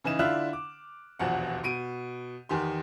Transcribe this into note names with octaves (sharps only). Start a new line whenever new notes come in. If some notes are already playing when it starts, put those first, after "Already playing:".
C#3 E3 D#4 E7
D3 D4 E4 F4 F6 F#6
D6
D#1 A#1 E2 B2 F#5
B2 D7 D#7
E2 D#3 G4 C6